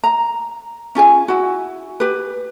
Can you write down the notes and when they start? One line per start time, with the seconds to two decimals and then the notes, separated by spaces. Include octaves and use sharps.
0.04 A#5
0.95 C#4 F4 G#4 G#5
1.28 E4 F#4
2.00 G4 B4